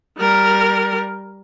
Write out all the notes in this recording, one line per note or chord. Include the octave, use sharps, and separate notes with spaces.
G3 A#4